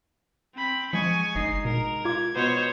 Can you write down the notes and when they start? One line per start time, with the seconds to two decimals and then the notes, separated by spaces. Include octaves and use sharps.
0.55 C4 B5
0.93 F3 G#3 G#5 C#6
1.35 G1 D#4 D#5 C7
1.65 B2 A#4
2.05 F4 D6 G#6
2.35 B2 C5 C#5 D#5